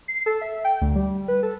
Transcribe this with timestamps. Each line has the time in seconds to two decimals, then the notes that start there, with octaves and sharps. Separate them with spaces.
0.08 C7
0.26 A4
0.41 E5
0.64 G5
0.81 D2
0.95 G3
1.28 B4
1.43 A4